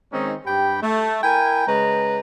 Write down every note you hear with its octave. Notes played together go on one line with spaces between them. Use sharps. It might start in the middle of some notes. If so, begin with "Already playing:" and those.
D#3 G#3 C4 C#4 D#4
G2 G4 G5 B5
A3
E4 A#4 G5 G#5
C#3 G#3 B4 A#5